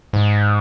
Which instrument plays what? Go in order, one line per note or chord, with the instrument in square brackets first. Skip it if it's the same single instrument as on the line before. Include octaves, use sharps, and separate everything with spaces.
[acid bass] G#2